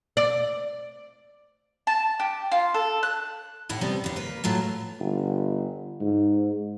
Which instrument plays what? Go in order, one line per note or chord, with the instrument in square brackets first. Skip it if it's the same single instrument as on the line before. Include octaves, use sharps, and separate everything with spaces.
[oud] D5
[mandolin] A5
G4
F4
A4
F#6
[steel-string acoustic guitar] D#2 A2 E4 F#5
C3 F3 G3 B3
D#2 B3
A#3 B4
A2 F#3 A3 F4
[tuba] G1
G#2